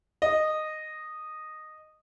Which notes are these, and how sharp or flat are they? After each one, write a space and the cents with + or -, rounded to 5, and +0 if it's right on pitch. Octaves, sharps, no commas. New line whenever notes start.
D#5 -10